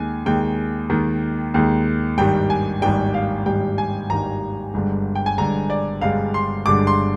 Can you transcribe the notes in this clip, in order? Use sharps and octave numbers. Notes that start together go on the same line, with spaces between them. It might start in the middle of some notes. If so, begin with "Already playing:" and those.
Already playing: D#2 D#3 G#3 G#5
D#2 D#3 G#3 G5
D#2 D#3 G#3
D#2 D#3 G#3
G#1 G2 D#3 G3 G5
G#5
G#1 G2 D#3 G3 G5
F5
G#1 G2 D#3 G3 G5
G#5
G#1 G2 D#3 G3 A#5
G1 G2 D3 G#3
G5
G#5
G1 G2 D3 G#3 A#5
D5
G1 G2 D3 G#3 F5
C6
G1 G2 D3 G#3 D6
C6